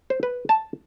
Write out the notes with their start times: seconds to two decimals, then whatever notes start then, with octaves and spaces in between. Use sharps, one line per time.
0.10 C5
0.23 B4
0.49 A5